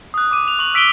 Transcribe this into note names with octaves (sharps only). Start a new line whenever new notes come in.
D#6 F#6
D6 D#7
F7
C#6 F#7
E6 B6 D7 D#7 G7